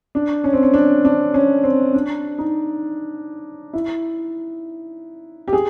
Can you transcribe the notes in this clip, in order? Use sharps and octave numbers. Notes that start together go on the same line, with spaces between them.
D4
C#4
C4
C#4
D4
D4
C#4
C4
D4
D#4
E4
G4
G#4